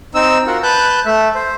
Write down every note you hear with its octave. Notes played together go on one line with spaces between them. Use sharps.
C4 D#4 E6
F4 F#4 A#4 F#5
B4 A5 F#6 G6
A3 E5
C5